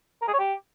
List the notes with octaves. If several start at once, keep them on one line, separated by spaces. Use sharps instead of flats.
A#4
G#4
C#5
G4